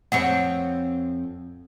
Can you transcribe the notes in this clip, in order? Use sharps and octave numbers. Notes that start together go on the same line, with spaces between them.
F2 C4 C5 C#5 F#5